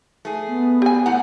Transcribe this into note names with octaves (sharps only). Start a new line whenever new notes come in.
A3 G#4
B3
G4 G#5
A2 F#5 A#5